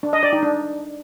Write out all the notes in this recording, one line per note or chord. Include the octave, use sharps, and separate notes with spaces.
D4
D#5
D5
D#4
D4